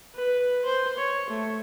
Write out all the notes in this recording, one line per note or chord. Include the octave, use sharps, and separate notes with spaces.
B4
C5
C#5
A3